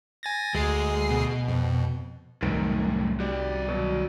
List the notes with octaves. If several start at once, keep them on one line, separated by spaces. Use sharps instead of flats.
G#5 A6 A#6
D2 G#3 G#4 C7
B2
F2
C2 F#2 A2 D#3 B4 D7
G3 F#4 D5
B2 F#3